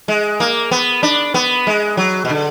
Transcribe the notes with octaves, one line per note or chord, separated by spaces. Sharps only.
G#3
A#3
B3
D4
B3
G#3
F#3
B2
D3